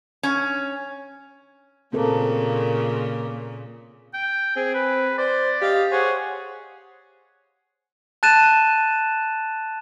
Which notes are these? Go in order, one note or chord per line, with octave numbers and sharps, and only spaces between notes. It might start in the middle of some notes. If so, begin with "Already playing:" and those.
C#4
A#2 C#3 A#3 C4 A4 A#4
G5
C4 G#4
B4
C5 D5
G4 D#5 F5
G#4 C5 C#5 F#5
A5 F#6 A6 D#7 E7